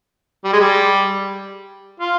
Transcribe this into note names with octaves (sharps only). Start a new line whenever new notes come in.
G3
G#3
G3
F4